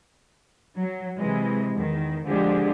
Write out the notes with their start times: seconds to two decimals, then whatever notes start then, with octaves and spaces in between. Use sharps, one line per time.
0.78 F#3
1.18 C3 E3 G#3
1.74 E2 D#3
2.27 D3 F3 G#3 D4 G4 G#4